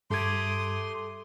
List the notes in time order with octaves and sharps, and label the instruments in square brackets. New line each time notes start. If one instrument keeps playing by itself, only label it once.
[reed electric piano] G2 G#6 [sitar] A3 G4 A4 [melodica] C6 [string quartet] D6 D#6